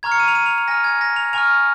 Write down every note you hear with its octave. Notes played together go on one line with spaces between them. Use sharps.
A#5 C#6 F6 G#6
C#7
D#7
F7
D#7
F7
F7
G#5 F6 A#6
G#6
A#6
F7
G#5 C#6 F6 F7